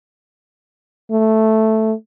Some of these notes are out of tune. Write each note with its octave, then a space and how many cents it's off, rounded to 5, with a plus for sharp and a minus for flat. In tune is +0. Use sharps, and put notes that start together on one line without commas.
A3 +0